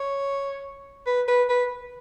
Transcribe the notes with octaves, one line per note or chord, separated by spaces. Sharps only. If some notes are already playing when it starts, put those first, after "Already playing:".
Already playing: C#5
B4
B4
B4